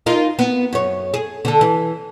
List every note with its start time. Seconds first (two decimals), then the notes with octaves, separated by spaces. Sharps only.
0.06 D#4 F4 A#4
0.39 B3
0.73 F#2 C#5
1.14 G#4
1.45 D3 A4
1.61 E3